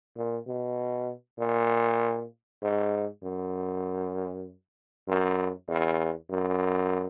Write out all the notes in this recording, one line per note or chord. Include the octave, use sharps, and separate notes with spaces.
A#2
B2
A#2
G#2
F#2
F#2
E2
F#2